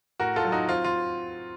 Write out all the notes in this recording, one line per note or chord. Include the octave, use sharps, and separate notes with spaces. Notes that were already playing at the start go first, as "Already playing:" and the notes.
A2 F#4 A#4
F4 A4
F#3
D#4 F#4
C4 F4
F4